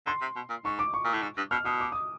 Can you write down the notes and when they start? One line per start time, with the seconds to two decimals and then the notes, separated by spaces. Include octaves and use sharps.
0.06 D3 C6
0.22 C3
0.36 B2
0.50 A#2
0.65 G#2 C#6
0.79 D6
0.94 C#6
1.05 A#2
1.14 A2
1.22 G#2
1.37 G2
1.51 B2 F6
1.65 B2 D#6
1.80 D6
1.92 D#6